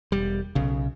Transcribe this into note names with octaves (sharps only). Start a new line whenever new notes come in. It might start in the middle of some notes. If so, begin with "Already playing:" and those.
E1 G3
B1 C#3